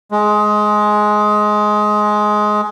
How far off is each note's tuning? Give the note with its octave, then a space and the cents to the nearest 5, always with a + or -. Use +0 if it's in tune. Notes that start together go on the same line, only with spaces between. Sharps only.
G#3 +15